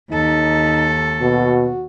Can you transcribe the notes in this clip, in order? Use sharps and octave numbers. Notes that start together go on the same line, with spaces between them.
D#2 D#4 A4
B2 F#4